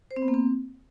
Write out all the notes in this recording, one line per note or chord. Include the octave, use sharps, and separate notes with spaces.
C5
C4
B3
A#3
C4